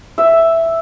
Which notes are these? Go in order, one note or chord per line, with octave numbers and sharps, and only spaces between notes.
E5